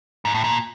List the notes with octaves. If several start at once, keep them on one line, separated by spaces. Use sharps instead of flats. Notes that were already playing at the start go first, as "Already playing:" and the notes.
G#2
A2
A#2